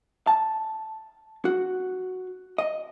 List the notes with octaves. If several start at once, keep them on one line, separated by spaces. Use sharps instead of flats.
A5
F#4
D#5